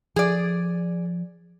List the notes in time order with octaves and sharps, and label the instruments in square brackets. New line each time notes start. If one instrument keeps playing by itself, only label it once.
[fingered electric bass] F3 [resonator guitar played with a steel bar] G#4 D5